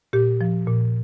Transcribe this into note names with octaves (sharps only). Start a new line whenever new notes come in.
A#2 G4
F3
A#2